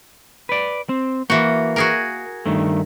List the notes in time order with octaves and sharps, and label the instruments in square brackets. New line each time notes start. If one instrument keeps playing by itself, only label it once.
[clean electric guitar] B4 D5
C4
[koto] E3 F#4 [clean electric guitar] A#3
[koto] F#4 G#4 A#4
[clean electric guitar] G2 D#3 A3